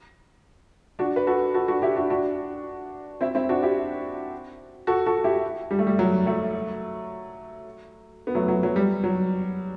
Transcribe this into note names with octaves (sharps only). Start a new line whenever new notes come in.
D4 F#4
B4
F#4 A4
F#4 A4
D4 F#4
E4 G4
D4 F#4
D4 F#4
C4 E4
C4 E4
D4 F#4
E4 G4
F#4 A4
F#4 A4
E4 G4
G3
A3
G3
F#3
F#3 A3
B3
F#3 A3
F#3
F#3
G3
F#3